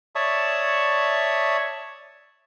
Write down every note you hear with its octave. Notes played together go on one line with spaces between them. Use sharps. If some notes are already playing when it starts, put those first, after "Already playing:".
C#5 D5 E5 A5 C#6 D#6